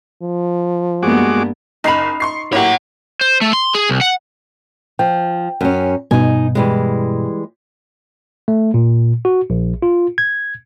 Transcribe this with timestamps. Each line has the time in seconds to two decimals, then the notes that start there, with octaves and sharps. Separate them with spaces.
0.23 F3
1.03 G2 G#3 A#3 B3 F#4 D6
1.84 F#1 D#4 B5 C7 F7
2.20 C6 C#6 C7
2.53 A2 A#3 G4 C#5 F#5
3.21 C5
3.41 A3
3.53 C6
3.75 G#4
3.89 C2
4.01 F#5
4.99 F3 G5
5.61 F#2 C#4
6.11 G2 B2 D#4 G#5
6.55 E3 G3 G#3
8.48 A3
8.74 A#2
9.25 F#4
9.50 A#1
9.82 F4
10.18 G#6